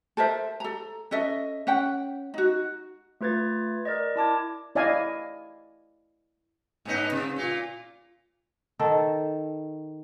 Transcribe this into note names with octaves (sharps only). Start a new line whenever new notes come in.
A4 A#4 C5 E5
A4 A#5
C#4 A4 D#5 E5
C#4 F#5 G5
D#4 F#4
A3 F4 B4 G#6 A6
A#4 D5 D#5
E4 A5 D6 G#6
E4 D5 D#5 F5 G#5 D#6
G#2 B3 D#4
C3
A#2 F4
D#3 A4